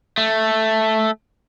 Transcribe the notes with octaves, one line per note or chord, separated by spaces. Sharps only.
A3